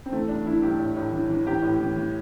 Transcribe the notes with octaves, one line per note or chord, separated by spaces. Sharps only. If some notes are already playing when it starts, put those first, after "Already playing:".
C4
E3 A3
G2 D4
E3 E4
G2 G4
A2
A2
E3
E3
E3 G4
A2
E3
E3